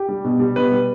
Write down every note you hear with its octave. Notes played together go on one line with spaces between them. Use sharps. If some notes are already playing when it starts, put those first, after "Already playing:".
Already playing: G4
G3
B2
G3
B2 B4
G3